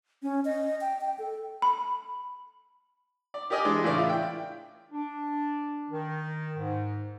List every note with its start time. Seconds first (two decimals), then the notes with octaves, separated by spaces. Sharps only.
0.23 C#4
0.45 D#5
0.81 G5
1.01 G5
1.19 A4
1.62 B5
3.34 D5
3.50 G4 A#4 D5 D#5 G#5
3.65 E3 G#3 D4
3.84 A2 C#3 E3 A#4 D5
3.96 E4 F4
4.09 G5
4.92 D4
5.90 D#3
6.56 G#2